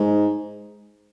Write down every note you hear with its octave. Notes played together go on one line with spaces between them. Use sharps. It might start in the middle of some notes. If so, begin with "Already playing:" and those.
Already playing: G#2